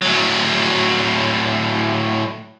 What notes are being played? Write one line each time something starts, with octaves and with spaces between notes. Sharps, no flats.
A2 F#3